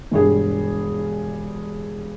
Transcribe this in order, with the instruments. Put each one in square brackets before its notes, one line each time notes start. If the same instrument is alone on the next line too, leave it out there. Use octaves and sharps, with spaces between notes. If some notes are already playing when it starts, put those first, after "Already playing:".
[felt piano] E1 G2 G#4